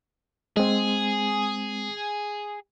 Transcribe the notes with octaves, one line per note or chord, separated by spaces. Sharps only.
G#3 C4 G#4